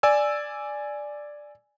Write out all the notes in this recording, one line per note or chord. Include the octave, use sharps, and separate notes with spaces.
D5 G#5 E6